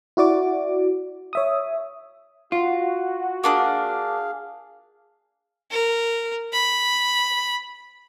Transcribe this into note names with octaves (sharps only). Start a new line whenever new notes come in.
E4 F#4 D5 D6
C#5 E5 D#6
F4 F#4
A#3 D4 G#4 F5 D#6
A#4
B5